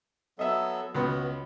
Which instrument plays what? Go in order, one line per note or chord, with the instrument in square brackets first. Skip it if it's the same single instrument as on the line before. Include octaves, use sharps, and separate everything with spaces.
[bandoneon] F#3 B3 A4 [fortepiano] D#5 E5
[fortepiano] C#2 B3 [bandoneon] F#4